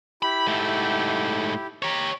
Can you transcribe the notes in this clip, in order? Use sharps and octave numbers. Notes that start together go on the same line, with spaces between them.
E4 G4 B5
G#2 A3
G4 C#5 A#5